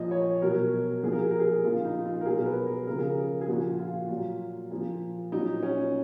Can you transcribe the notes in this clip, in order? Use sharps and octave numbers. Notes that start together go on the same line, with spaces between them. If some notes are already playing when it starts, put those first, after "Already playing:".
Already playing: A#2 F3 D#5
C#5
B2 F#3 A#4
A#2 F3 G#4
A#4
G#4
A#4
G#4
A#2 F3 F4
D#4
F4
A#4
B2 F#3 G#4
A#4
B4
A#4
C#3 F3 A#4
G#4
A#4
G#4
A#2 F3 F#4
F4
A#2 F#3
A#2 F3
A#2 F#3 D#4
C#4